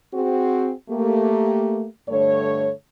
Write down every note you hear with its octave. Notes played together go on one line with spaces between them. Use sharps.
C4 F#4 G#4
A3 A#3 G4
G2 D3 A3 C#5